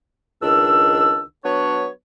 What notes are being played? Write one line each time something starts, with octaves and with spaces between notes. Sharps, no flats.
C#2 D#3 D4 E6
F#3 B3 D4 C#5